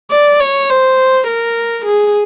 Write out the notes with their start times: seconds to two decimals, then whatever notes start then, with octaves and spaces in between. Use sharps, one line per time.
0.11 D5
0.40 C#5
0.69 C5
1.27 A#4
1.85 G#4